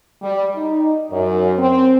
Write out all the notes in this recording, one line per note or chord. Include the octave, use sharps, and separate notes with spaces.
G3
D#4
F#2
C4